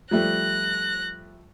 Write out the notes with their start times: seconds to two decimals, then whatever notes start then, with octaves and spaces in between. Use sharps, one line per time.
0.11 F3 G3 A3 F#6 A#6